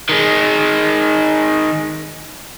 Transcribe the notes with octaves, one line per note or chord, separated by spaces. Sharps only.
D#3 G#3